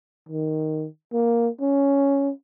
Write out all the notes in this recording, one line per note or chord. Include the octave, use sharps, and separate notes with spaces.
D#3
A#3
C#4